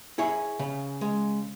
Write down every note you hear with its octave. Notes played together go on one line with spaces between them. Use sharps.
E4 G#4 C#5
C#3
G#3